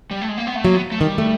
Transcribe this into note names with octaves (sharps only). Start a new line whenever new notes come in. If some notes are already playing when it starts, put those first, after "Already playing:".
G3
A3
G#3
A#3
B3
A3
F#3 A#3
B3
A3
D#3 G3
A3